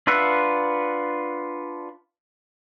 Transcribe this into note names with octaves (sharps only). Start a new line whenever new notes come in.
D4 F4 B4 E5 F#5